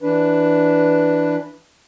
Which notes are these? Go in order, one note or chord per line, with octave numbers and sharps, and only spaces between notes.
E3 D4 B4